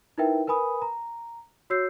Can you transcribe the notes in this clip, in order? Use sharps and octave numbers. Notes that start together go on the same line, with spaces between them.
D#4 E4 A#4 B4 E5 G5
A#4 B4 G#5 B5 D#6
A#5
F#4 C#5 E6 G6 C7